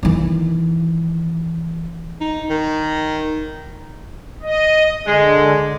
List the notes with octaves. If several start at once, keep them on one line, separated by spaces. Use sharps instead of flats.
D#3 E3
D#4
D#3
D#5
D3 G#3